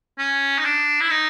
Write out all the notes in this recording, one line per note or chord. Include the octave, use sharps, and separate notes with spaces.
C#4
D#4
D4
E4
D#4